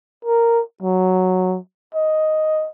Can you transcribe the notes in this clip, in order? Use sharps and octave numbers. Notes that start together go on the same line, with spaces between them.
A#4
F#3
D#5